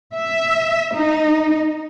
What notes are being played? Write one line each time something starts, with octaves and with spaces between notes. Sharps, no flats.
E5
D#4